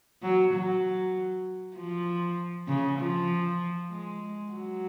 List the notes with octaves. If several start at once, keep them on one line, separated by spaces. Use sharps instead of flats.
F#3
F#3
F3
C#3
F3
G#3
F#3